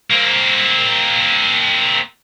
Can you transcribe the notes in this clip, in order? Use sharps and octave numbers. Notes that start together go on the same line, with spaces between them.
A#3 C4